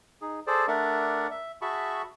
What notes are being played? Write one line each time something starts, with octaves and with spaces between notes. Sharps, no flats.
D#4 G#4
G#4 A4 C5 D5
A3 D4 A#4 D5 E5 F#5
E5
F#4 G#4 E5 A5 B5 C#6